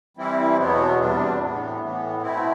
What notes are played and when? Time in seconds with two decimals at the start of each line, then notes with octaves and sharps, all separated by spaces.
0.17 E3 G3 C4 E4
0.58 E2 B2 F#3 B3
0.99 E2 C3 G3 D4
1.39 A2 E3 B3
1.81 A2 E3 B3
2.22 B2 A3 C4 E4